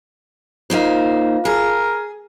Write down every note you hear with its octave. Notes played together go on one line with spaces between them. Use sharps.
A#3 D#4 F4 C5 F5
G#4 A#4